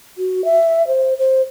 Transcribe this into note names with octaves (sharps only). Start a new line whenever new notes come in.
F#4
E5
C5
C5